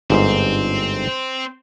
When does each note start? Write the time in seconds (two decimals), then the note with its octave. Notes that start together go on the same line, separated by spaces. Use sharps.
0.10 G1 G#2 C4 C5